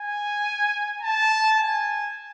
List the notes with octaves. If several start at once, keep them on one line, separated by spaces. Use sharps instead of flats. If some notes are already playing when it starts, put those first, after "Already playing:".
Already playing: G#5
A5
G#5